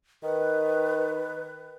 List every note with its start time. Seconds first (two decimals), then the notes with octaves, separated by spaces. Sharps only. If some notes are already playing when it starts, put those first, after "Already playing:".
0.23 D#3 B4